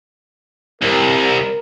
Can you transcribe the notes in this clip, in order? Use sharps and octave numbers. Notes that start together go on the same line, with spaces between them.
C2 A#4